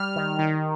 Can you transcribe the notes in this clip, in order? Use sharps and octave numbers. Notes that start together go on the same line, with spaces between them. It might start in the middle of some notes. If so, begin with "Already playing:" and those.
Already playing: G3 F6
D#3
D#3